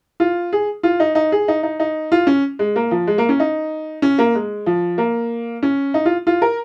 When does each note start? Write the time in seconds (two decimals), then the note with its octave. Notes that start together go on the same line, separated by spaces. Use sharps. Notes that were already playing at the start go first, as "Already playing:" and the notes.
0.20 F4
0.53 G#4
0.83 F4
1.00 D#4
1.15 D#4
1.32 G#4
1.48 D#4
1.63 D#4
1.80 D#4
2.12 F4
2.27 C#4
2.59 G#3
2.76 A#3
2.91 F3
3.07 G#3
3.18 A#3
3.29 C#4
3.40 D#4
4.02 C#4
4.19 A#3
4.35 G#3
4.66 F3
4.98 A#3
5.63 C#4
5.94 D#4
6.05 F4
6.27 F4
6.42 A#4